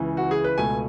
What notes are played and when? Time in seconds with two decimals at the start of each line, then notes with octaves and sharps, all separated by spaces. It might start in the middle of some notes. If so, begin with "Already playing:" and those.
Already playing: C#2 C#3 E3
0.17 F#4
0.31 G#4
0.44 B4
0.57 C#2 B2 A3 G#5